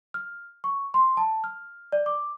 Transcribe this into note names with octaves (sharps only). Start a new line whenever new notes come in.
F6
C#6
C6
A5
F6
D5
D6